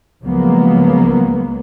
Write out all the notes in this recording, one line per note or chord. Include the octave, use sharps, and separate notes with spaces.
C#2 F3 F#3 G#3 A#3 B3